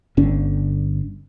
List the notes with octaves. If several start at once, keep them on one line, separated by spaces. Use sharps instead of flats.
G1 D3 C#4